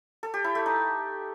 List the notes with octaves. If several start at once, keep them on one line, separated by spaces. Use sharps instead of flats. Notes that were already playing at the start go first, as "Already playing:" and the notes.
A4
G4
E4
A3
D#4